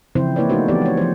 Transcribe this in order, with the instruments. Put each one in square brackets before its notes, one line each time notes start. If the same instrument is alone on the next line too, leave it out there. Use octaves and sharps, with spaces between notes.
[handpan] C#3 E3 F3 C4 E4 C5
A#3 E4 B4 C#5 D5
A3 B3 D#4 F#4 C5
E3 F3 B3 C4 G4 D5
G#3 C#5
F3 C5